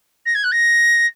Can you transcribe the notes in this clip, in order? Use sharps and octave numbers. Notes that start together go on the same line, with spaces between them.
A#6
G#6
F#6
A#6